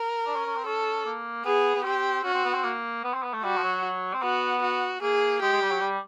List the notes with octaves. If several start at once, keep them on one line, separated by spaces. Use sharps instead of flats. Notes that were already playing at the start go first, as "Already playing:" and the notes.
Already playing: A#4
D4
C#4
C#4
C4
C#4 A4
A#3
B3 G#4
B3
C4 G4
C#4 F#4
C4
B3
C4
A#3
B3
C4
B3
A3
G3 F#4
F3
F#3
C4
B3 F#4
F#4
A#3 G#4
G#3 G4
G#3
G3
F#3
G3